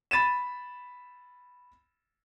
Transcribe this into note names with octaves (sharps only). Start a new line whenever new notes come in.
B5 A6 D#7 E7